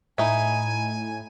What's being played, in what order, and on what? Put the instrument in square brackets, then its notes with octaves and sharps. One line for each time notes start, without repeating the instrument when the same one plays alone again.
[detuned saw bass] A2 [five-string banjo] D#4 E4 [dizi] G#5